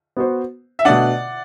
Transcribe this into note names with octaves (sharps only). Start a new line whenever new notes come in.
B3 F#4 C5
E5
B2 A3 D4 D5 F#5